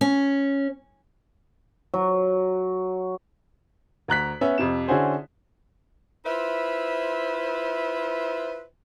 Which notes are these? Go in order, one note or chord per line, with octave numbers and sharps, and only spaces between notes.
C#4
F#3
D2 A#5 F#6 B6
B3 C#4 B4 E5
F2 C3 E7
D3 C#4 E4 F#4 G#4 C5
E4 F4 B4 C5 E5